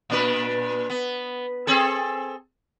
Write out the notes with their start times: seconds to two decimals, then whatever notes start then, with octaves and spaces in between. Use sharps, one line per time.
0.10 A#2 D4 B4
0.90 B3
1.67 C4 G#4 A4